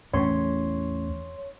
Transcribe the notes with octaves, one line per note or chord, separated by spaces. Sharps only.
E2 A3 C#4 C#5 C6